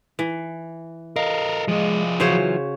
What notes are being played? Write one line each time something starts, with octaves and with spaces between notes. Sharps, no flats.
E3
A4 A#4 D#5 F5
F3 G#3 G#4
C#3 E3 F#3 F4 F#4 C5 C#5